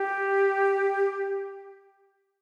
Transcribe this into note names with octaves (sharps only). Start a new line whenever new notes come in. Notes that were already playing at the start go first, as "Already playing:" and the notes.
Already playing: G4